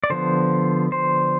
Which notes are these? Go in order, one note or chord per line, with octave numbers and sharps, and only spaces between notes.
D5
D3 F3 B3 C5
C5